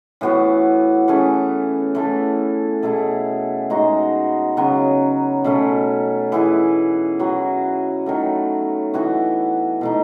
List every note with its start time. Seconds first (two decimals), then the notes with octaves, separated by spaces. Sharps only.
0.21 A2 E3 B3 F#4
1.08 E3 A3 C#4 G#4
1.95 E3 A3 E4 A4
2.83 B2 A3 E4 G#4
3.70 G#3 B3 D#4 F#4
4.57 C#3 F#3 B3
5.44 B2 A3 C#4
6.32 E3 B3 E4 G#4
7.19 F#3 B3 F#4
8.06 D#3 F#3 A3
8.94 E3 B3 F#4
9.81 B2 A3 D#4